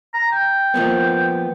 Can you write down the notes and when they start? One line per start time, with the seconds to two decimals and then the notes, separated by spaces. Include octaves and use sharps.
0.14 A#5
0.33 G5
0.74 F3 A#3 B3